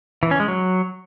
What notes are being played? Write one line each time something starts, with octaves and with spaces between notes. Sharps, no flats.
E3
C#4
G#3
F#3